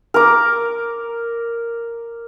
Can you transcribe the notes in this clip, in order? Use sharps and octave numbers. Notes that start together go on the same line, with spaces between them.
A#4 D6